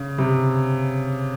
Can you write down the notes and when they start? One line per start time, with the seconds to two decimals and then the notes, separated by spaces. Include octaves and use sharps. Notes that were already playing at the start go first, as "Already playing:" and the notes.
Already playing: C#3
0.18 C3